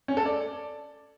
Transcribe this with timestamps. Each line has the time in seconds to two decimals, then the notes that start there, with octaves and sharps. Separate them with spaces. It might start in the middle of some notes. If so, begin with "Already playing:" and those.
0.08 C#4
0.17 A4
0.26 D5